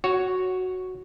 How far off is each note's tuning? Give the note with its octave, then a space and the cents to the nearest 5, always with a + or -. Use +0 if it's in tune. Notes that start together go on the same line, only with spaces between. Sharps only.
F#4 +0 C#5 +0